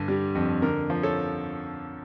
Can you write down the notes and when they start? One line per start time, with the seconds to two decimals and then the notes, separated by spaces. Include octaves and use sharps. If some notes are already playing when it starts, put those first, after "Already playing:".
Already playing: G2 D3
0.08 G3
0.35 F2
0.62 D3 A#4
0.90 F3
1.03 A4 C#5